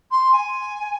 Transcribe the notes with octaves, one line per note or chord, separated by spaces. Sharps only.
C6
G#5